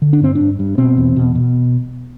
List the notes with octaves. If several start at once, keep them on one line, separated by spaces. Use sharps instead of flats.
D3
D4
G2 C4
G2 D4
G2
B2 C4
E2
B2
B2